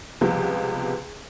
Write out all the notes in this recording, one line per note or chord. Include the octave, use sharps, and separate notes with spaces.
C#2 C3 F3 G3 B3